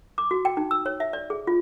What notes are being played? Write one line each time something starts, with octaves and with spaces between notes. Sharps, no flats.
D6
F#4
G5
D#4
E6
C#5
E5
D5
G#4
F4